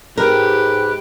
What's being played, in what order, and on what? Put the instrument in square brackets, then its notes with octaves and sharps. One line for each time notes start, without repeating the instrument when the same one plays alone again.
[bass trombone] G#2 [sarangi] G4 [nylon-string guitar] A#4 [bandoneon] B4